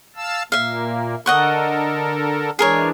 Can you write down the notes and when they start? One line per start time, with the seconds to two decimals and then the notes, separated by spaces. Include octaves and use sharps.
0.16 F5 A5 E6
0.52 A#2 A#3 E5 F5
1.26 D3 A4 A#4 D#5 F#5 C#6
2.59 E3 G#3 D4 G#4 A#4 C#5